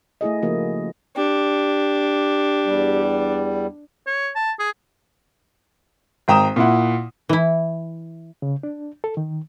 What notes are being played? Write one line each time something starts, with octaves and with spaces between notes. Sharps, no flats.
A3 E4 G#4 D#5
C#3 F3 A#3 F#4 A#4
D4 G4
E2 G3
C#5
A5
G#4
G#1 G5 A#5 D#6 E7
A#2 E4 F#5
E3 E4
C#3
D4
A4
D#3